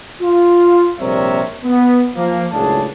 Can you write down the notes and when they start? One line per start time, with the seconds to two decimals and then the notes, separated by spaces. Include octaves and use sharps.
0.21 F4
1.00 A#1 C3 G3 A#4 C#5 E5
1.64 B3
2.16 F3 A#3
2.52 C#2 F#2 A2 D4 G#4 A5